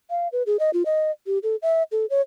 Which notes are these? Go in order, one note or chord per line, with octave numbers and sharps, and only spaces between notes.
F5
B4
G#4
D#5
F4
D#5
G4
A4
E5
A4
C#5